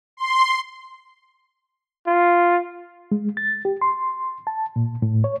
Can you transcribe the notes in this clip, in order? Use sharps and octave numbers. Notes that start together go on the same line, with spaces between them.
C6
F4
G#3
A6
G4
C6
A5
A#2
A2
C#5